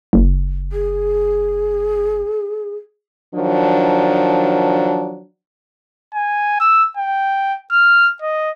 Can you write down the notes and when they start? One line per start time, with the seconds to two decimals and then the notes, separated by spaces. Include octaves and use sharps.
0.13 F#1
0.72 G#4
3.35 D#3 F3 F#3 D4
6.14 G#5
6.60 E6
6.97 G5
7.72 F6
8.22 D#5